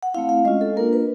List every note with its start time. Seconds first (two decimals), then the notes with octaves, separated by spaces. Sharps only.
0.03 F#5
0.14 A3 C4 E4 F5
0.29 F5
0.45 G#3 C#4 F4 D#5
0.61 A4
0.77 A#3 D4 F4 A#4
0.93 B4